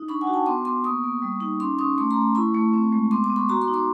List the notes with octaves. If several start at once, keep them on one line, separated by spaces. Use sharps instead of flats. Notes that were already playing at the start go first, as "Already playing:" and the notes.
Already playing: D#4
D4 B5 C#6
F#5 G#5
F#4
G5 A5
B3 C6 D6
B3 C6 D6
A#3 C#6 D#6
A#3
G3
D#4
C#4 C6 D6
C#4 C#6 D#6
A3 C6 D6
A#5 C6
A3
E4 B5 C#6
A3
C4
G#3
B3 C6 D6
C6 D6
B3
B5 C#6
F#4 A#5 C6
C6 D6
D#4
C6 D6